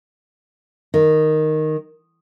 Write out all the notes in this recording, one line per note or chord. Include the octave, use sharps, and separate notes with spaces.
D#3